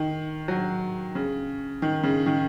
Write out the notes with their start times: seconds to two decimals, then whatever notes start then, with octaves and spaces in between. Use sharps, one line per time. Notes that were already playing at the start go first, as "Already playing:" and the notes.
Already playing: D#3
0.48 F#3
1.15 C#3
1.82 D#3
2.03 C#3
2.26 D#3